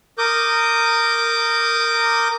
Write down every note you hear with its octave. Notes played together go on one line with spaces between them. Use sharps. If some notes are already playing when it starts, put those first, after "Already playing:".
A#4 D6 D#6 G6